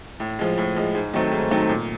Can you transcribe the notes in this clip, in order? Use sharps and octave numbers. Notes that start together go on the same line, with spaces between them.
A2
F3 G#3
A2
F3 G#3
G#2
D#3 F#3 A3 C4
G#2
D#3 F#3 A3 C4
A#2